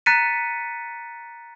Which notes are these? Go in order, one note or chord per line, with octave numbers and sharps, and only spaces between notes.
A#5 F#6 A6 B6 C#7 D#7